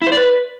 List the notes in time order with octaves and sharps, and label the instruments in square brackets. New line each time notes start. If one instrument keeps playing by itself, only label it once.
[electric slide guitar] E4
C5
D5
B4